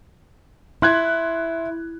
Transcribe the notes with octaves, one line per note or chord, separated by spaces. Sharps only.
E4 C6 F#6 G#6